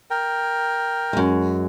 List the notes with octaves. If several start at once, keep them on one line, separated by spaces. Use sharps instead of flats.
A#4 G5
F#2 G#3